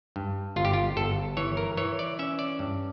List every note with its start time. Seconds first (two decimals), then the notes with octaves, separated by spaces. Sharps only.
0.16 G2
0.56 G1 F4
0.65 G4
0.73 F4
0.97 G1 A4
1.37 E3 C#5
1.57 A#4
1.77 E3 C#5
1.99 D5
2.19 C#4 E5
2.39 D5
2.59 G2